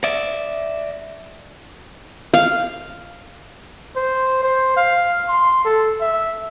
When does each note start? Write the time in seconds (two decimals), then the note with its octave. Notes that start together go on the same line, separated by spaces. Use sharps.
0.04 D5 E5
2.34 F5
3.96 C5
4.43 C5
4.77 F5
5.29 C6
5.65 A4
6.01 E5